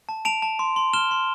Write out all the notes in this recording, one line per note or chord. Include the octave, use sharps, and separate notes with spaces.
A5
A5 D7 F7
A5
C6
C6
F6 E7 G7
C6